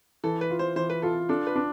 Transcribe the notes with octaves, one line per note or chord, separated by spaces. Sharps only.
E3 A4
B4
F4
C5
E3 C5
B4
F4 A4
D4 A4
B4
D4